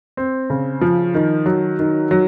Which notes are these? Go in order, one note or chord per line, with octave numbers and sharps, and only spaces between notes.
C4
C#3
F3
D#3
F#3
D#3
F#3